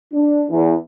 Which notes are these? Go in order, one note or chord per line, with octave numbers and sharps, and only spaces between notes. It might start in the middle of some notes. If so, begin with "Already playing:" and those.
D4
E2